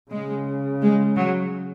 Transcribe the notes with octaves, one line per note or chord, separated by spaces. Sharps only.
C#3 G#3
G#3
F#3